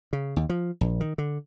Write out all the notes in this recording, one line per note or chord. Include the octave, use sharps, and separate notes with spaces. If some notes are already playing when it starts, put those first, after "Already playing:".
C#3
D#2
F3
A#1
D#3
D3